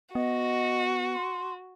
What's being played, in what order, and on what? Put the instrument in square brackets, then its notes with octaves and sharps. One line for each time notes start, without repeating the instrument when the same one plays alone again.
[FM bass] B3 [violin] F#4 [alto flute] D#5
[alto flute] C6